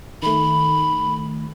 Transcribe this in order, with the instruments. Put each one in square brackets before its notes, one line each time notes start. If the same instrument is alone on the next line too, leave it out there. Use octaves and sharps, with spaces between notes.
[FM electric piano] D#3 A3 [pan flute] B5